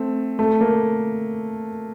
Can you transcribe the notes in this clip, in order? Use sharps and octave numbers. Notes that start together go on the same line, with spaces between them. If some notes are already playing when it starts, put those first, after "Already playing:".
Already playing: A3 C4
A3
A#3